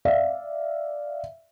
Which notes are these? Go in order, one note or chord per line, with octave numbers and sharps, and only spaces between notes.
D5 E5 F5